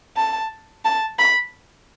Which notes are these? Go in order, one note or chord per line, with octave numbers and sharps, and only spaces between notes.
A5
A5
B5